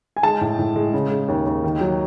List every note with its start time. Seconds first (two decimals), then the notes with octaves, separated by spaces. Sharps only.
0.17 G#5
0.23 G#3 A5
0.41 A2
0.59 A2
0.76 G#3
0.93 C#3
1.11 G#3
1.28 D#2
1.46 D#2
1.64 D#3
1.81 F#3